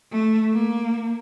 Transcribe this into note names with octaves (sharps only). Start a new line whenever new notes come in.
A3
A#3